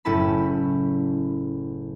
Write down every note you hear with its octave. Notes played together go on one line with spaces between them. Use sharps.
F#1 A2 C#4 E4 A5 B5